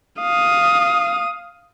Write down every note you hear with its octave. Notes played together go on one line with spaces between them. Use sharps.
F5 D#6